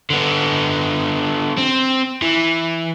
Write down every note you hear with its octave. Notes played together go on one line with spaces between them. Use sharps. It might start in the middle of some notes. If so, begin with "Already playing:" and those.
D3 B3
C4
E3